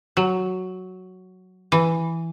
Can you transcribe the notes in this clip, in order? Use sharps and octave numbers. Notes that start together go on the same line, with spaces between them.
F#3
E3